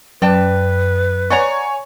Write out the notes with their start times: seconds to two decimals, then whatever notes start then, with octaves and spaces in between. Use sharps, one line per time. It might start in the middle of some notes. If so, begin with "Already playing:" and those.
0.22 F#2 B4 D5 G5 A5
1.30 C#5 D5 F#5 G#5 A#5 C#6